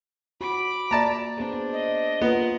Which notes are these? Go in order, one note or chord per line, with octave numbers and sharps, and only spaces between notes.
F#4 B5 D6
A#3 D5 A5 A#5
B3 D4 G#4 C5
D#5
A#3 B3 F4 A#4 F#5